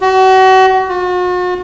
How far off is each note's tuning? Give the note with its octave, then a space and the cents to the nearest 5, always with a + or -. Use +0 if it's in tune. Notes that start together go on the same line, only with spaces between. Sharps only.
F#4 +35
F#4 -45